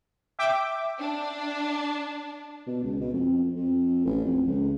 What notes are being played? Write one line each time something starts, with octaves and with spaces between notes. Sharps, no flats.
E5 G5 D6
D4
B2
C#2
B2
F2
F2
A1
F2
C#2